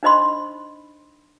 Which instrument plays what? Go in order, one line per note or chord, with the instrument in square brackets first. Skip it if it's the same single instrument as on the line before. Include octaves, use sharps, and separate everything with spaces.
[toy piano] D4 D#4 C5 D#5 B5 C6